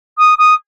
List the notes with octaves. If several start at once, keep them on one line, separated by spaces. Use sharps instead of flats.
D#6
D#6